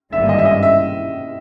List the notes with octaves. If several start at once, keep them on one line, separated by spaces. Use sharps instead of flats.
G#1 G2 D3 G3 A#3 E5
D#5
E5
D#5
E5